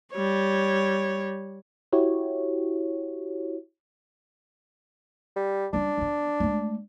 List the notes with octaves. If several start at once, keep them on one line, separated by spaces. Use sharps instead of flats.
G3 C#5
E4 F#4 G4 C#5
G3
G3 C#4 D4
E3 B3
G#3 A3